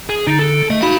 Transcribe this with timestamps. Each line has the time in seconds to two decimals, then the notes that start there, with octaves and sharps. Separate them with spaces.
0.09 G#4
0.27 D3 D#4
0.39 A4
0.70 A3 D#5
0.82 D#4 F#4 F5 B5